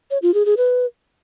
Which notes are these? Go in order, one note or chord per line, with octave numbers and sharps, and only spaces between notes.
C#5
F4
G#4
G#4
B4